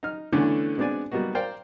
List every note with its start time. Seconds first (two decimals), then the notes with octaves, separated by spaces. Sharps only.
0.03 D#4 F6
0.33 D3 E3 A3 B3 C#4 D4
0.78 G#3 B3 C4 D4 D5 G#5
1.12 G3 A#3 B3 D#4 F#4
1.35 A#4 C5 D5 F5 G5